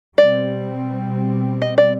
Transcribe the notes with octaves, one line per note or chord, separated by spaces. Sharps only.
B2 G3 C4 D5
D#5
D5